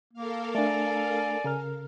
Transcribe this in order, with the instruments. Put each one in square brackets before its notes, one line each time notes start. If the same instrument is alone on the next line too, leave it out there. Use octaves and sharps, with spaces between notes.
[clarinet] A#3 [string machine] A4 A#4 F5
[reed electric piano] A3 D4 [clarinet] D5 [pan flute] G#5
[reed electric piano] C#3 A#4 F6